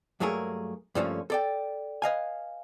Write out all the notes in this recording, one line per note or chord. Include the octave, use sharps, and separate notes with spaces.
G2 F#3 A3 A#3 G#4 A#4
G2 D3 F3 A3 A#3 C#4
A4 D5 G5
B4 D#5 F5 G#5